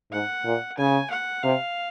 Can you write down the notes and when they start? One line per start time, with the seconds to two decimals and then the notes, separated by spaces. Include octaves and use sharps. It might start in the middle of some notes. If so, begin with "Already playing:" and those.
0.12 G#2 F#5
0.45 A#2
0.78 C#3 G#5
1.11 F#5
1.43 C3 F5